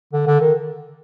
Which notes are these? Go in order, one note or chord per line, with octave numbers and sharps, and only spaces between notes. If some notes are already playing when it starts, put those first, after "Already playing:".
D3
D3
D#3